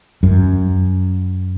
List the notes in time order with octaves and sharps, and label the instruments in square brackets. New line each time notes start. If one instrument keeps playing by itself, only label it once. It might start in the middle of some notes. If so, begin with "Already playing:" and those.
[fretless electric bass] F#2